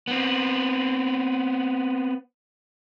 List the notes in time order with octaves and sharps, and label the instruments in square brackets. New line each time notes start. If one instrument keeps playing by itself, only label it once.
[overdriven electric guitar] B3 C4